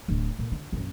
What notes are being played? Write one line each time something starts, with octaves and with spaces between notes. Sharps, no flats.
D1 D3
A#2
D3
A#1 F#2